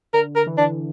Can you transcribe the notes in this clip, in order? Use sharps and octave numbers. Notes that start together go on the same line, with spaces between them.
D3 A#4
A#4
E3
D3 D4